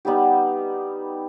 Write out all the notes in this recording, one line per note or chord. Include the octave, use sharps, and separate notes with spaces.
G3 B3 D#4 G4